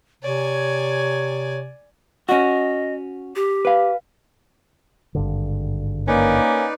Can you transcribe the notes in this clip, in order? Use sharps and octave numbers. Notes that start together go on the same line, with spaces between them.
C3 C#5 D5 G#5
C#4 F#4 D#5
G4
B4 F5
G#1 G2 D3
A#3 C#4 D#4 B4 D5